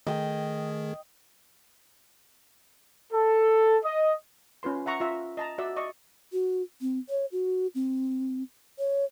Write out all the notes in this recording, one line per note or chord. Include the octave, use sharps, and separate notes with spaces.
D#3 A3 G#4 D#5 G5
A4
D#5
C#4 F4 B4 C6
E5 F#5 A#5 C#6
F4 E5 A#5
D#5 A5 A#5
F#4 D5 E5 E6
D5 D#5 C#6
F#4
C4
C#5
F#4
C4
C#5